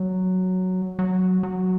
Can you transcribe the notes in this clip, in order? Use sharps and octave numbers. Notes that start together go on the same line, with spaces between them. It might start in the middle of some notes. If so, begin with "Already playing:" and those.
Already playing: F#3
F#3
F#3